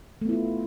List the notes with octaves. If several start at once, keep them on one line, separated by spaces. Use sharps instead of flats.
A3 B3 E4 F4